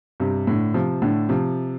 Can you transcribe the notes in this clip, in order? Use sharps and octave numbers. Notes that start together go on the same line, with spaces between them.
G2 C3
A2 D3
C3 F3
A2 D3
C3 F3